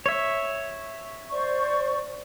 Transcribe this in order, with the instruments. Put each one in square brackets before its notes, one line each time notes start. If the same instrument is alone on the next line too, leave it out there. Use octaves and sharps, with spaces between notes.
[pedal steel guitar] C#5 E5
[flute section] C5 D5 C#6